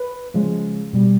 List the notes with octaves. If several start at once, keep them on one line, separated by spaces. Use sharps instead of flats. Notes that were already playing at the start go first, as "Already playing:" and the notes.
Already playing: B4
C#3 F3 G#3
B2 G3